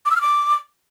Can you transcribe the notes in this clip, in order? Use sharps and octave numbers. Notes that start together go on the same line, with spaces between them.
D6
E6
F6
D6